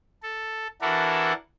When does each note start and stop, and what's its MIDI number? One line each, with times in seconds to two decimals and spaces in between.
0.23 0.67 69
0.81 1.33 52
0.81 1.33 62
0.81 1.33 64
0.81 1.33 66
0.81 1.33 69
0.81 1.33 70